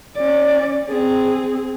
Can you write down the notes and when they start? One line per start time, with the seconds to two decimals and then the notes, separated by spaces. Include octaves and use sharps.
0.16 C#4 D5
0.89 C4 G#4